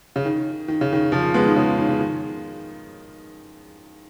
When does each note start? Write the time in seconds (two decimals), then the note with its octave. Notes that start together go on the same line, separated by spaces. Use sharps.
0.16 C#3
0.25 D#3
0.68 D#3
0.81 C#3
0.93 D#3
1.12 C#3 F3
1.34 G#3 B3
1.46 D#3
1.56 C#3
1.78 D#3
1.89 C#3
2.01 D#3